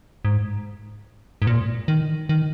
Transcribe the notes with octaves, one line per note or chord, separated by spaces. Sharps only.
G#2
G#2
A#2
D#3
D#3